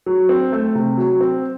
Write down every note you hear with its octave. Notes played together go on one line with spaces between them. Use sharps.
F#3
C4
A3
C3
F#3
C4